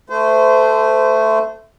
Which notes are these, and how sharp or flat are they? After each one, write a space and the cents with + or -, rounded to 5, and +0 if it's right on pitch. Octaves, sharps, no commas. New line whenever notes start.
A3 +0 C5 -30